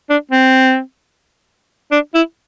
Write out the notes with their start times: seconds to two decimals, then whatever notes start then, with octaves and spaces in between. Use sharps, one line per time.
0.10 D4
0.31 C4
1.92 D4
2.14 E4